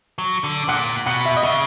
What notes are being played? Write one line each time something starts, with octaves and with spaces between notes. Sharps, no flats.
F#3
D3
A#2 F#5
B2 F#5
E5
D#5
C#3 E5